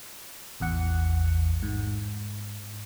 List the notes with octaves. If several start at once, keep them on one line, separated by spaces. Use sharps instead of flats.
A1 E2 F#5 C#7
G#2